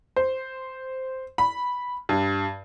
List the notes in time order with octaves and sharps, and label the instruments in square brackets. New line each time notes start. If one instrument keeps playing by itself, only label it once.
[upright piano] C5
B5
G2